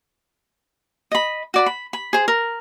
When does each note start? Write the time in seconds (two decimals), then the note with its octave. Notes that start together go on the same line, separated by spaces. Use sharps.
1.12 D#5 B5
1.54 F#4 D5 B5
1.66 B5
1.93 B5
2.13 G#4 C5
2.28 A#4